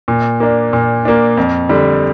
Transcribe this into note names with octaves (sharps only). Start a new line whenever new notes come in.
A#2
A#3 D4
A#2
A#3 D4
F2
D3 G3